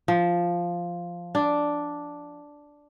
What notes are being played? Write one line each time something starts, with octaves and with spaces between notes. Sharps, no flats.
F3
D4